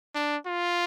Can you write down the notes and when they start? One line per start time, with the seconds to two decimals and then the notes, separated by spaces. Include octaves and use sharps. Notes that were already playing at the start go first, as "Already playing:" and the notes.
0.15 D4
0.47 F4